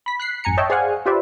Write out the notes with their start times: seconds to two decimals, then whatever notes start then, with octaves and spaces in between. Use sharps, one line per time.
0.06 B5 B6
0.20 F#6 B6 C7
0.44 A1 F#2 G#5 A#5 C#7
0.57 C#5 D#5 E5 G5 A5
0.70 G#4 C5 D5 F5 F#5 G#5
1.06 F4 G4 B4 C5 D5 E5